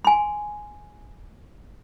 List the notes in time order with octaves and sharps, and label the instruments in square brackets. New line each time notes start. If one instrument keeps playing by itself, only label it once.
[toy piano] G#5 C6